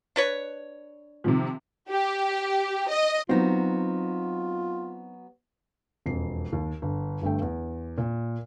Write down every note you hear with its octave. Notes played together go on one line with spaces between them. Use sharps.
D4 B4 C#5
C3 D#3 F3
G4
D#5
F#3 B3 C4 D#4 F4 F#4
E1 F2 C7
D#2
G1
G1 G2 A3 G5
E2
A#2